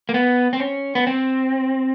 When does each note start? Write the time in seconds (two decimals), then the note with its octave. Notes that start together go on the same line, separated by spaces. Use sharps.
0.09 A#3
0.14 B3
0.53 C4
0.60 C#4
0.95 B3
1.07 C4